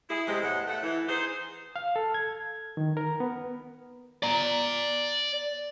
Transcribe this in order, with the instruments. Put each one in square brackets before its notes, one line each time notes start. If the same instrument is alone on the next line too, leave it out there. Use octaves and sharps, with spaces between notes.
[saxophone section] E4 G#4
C3 G#3
E2 A2 D#5 F#5
A3 E5 F#5
E3
D#4 G#4 C5
[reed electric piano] F5
A4
G#6
D#3
A#4
B3
[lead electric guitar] D5 A#5